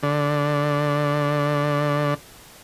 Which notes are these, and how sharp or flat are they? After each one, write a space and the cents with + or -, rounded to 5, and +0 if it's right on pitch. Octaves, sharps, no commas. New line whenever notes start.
D3 -5